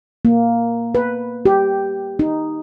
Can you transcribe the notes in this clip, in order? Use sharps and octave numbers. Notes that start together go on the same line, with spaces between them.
A#3
B4
G4
D#4